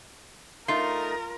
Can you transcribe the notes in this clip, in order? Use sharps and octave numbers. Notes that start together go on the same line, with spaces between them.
A3 D#4 F4 A#4